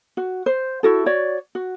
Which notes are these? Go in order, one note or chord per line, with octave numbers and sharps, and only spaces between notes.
F#4
C5
E4 F#4 A4
F#4 C#5 D5
F#4